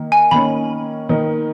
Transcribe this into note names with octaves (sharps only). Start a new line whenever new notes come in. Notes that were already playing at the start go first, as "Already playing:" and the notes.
Already playing: D#3 A#3
G#5
D#3 A#3 C#4 B5
D#3 A#3 D#4 A#4